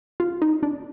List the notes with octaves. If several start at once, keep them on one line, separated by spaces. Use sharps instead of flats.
F4
D#4
D4